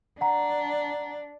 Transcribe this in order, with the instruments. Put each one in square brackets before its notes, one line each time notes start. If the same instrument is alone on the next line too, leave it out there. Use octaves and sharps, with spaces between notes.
[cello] D4 [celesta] F#5 A#5